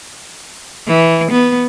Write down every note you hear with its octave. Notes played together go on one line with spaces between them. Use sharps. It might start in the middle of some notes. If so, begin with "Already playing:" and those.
E3
B3